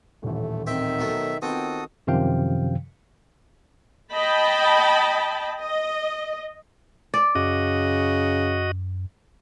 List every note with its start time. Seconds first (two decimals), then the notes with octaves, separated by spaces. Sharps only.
0.23 D#1 A1 A3
0.67 D#3 C4 E5 G5
0.99 B1 F#3 A3
1.42 D#3 B3 C4 F4 F#4 A4 G5 D#6
2.07 F#2 C3 D#3 F3 F5 G5
4.13 D#5 G5 A5 B5
5.61 D#5
7.14 D5
7.35 F#2 C#3 F#4 D#5